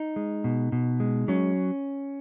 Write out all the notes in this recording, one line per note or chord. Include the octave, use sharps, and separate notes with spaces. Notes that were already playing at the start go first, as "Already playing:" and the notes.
Already playing: D#4
G#3
B2
B2
G#3
F#3 C#4